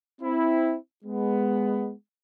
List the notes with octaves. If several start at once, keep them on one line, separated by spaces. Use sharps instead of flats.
C4 E4
G#3 B3